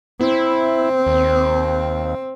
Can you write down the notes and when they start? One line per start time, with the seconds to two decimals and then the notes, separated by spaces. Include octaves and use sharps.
0.21 C4 E4
1.07 D#2